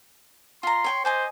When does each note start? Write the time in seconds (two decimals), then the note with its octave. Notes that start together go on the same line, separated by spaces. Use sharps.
0.63 F4 A#5 C6
0.84 C#5 G5 C#6
1.05 C5 D#5 G#5 D6